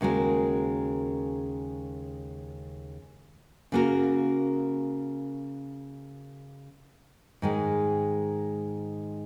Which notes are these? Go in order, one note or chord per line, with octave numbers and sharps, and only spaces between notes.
D#2 C#3 G#3 F#4 A#4
C#3 A#3 F#4 A#4
G#2 D#3 G#3